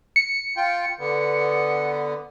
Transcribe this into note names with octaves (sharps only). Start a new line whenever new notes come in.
C#7
F4 G5
D3 B3